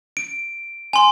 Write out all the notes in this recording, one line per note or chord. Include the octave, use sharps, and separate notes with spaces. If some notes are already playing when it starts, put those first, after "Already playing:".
D7
G#5 C6